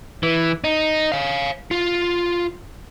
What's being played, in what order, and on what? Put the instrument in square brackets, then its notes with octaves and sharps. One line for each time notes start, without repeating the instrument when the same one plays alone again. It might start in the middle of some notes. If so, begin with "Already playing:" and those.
[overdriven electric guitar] E3
D#4
C#5 F5
F4